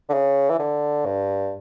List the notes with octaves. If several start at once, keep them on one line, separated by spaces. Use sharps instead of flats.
D3
C#3
E3
D3
G2